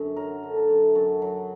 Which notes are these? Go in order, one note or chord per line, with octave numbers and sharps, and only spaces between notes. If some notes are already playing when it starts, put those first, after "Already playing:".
Already playing: F#2 D3
F#3 A#4
D3
A4
F#2
F#2 F#4
F#3